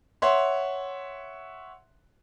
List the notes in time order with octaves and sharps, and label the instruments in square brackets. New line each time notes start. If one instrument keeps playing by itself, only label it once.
[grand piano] C#5 E5 F#5 C6